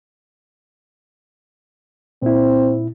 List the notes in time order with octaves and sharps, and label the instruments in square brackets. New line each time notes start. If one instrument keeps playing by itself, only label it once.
[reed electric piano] A#2 E4 [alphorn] C4